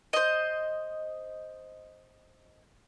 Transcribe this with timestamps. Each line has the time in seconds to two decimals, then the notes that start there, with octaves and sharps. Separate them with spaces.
0.13 C5 D#5